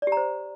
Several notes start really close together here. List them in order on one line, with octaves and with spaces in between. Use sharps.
D5 G4 A#5 C5